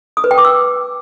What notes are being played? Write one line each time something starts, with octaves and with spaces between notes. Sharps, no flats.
D#6
B4
G5
D6
E6